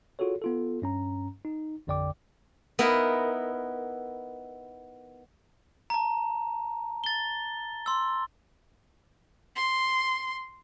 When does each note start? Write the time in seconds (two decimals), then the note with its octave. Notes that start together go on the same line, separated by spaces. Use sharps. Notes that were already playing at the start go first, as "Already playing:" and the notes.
0.19 F4 F#4 G#4 A4 C#5
0.42 B3 F4 A4
0.82 G2 C#4 A#5
1.45 D#4
1.87 A1 F2 D3 D5 G5 D6
2.79 B3 D#4 E4 A#4
5.90 A5 A#5
7.04 A6 G7
7.86 C6 E6
9.56 C6